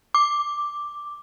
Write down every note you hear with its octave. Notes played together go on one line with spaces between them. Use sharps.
D6